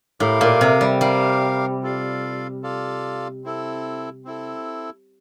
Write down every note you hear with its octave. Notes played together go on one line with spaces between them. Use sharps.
A2 G4 A#4 F5
A#2
C3
G3
G3 G4 A#4 F5
F4 A4 D5 F5
F4 A4 D5 F5
C4 E4 A4
C4 E4 A4